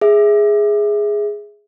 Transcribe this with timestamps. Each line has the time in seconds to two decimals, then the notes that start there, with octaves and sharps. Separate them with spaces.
0.01 G#4 E5